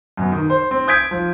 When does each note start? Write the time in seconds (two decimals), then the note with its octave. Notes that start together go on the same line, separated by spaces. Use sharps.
0.17 F#2 B2
0.32 D#3
0.50 C5
0.71 C4
0.87 D#6 G6 G#6 B6 D7
1.11 F3